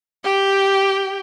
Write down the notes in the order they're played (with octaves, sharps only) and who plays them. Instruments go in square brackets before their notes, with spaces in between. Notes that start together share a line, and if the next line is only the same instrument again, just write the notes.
[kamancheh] G4 G5